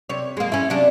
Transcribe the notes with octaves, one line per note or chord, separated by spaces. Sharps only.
C3 C#5
G#3 A#3
C#4 E4
C3 G3 D4